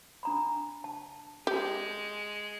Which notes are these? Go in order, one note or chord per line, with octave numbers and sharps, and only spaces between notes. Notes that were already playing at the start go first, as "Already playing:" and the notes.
D4 A#5 B5
A5
G#3 G4